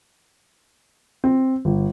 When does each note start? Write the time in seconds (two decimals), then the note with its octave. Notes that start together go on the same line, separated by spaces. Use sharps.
1.24 C4
1.65 G1